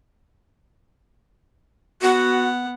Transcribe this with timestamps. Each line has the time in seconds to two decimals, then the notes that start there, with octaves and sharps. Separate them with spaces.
2.02 B3 F#4 F#5